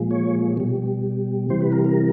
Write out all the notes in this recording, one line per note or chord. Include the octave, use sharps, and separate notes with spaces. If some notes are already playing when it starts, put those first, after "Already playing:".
Already playing: A#2 F3 G#3
C#5
B2 G3
C3 E3 G3 C5
B4
A#4
A#4